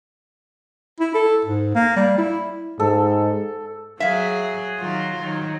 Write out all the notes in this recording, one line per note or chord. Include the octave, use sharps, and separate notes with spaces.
E4
A4
G#2
A#3
G3
E4
G#2 A4
F#3 G#4 E5 F5
D#3 F#3 F4
D#3 F#3